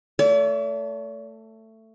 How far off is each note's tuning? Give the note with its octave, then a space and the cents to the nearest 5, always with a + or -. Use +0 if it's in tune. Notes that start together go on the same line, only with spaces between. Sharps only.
A3 +15 D5 -45